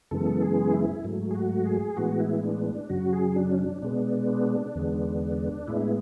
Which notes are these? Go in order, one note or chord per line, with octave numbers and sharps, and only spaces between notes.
F#2 C#3 E3 G#3 B3 A4
G#4
E4
G#2 F#3 A3
G#4
F#4
G#4
A2 E3 G#3 B3 F#4
E4
D4
D4
F#2 C#3 F#3 F#4
G#4
D4
C#4
D4
B2 G#3 B3 D4
E2 D3 G#3 B3
A2 G#3 B3 E4